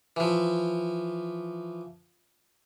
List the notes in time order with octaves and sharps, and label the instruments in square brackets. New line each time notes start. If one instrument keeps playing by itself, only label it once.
[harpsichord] E3 F3